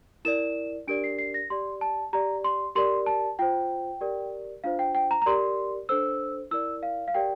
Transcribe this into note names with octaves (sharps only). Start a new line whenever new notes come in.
E4 A#4 D5 E7
D4 G4 A#4 D5 D7
C7
C7
A#6
G4 D5 C6
A5
G4 D5 A#5
C6
G4 A#4 D5 C6
A5
F4 C5 G5
G4 A#4 D5
D4 F4 C5 F5
G5
G5
A#5
A#5
G4 A#4 D5 C6
D4 A4 C5 E6
E4 A#4 D5 E6
F5
F5
G4 A#4 D5 G5